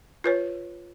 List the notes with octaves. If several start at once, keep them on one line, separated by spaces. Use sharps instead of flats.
F4 B4 C#5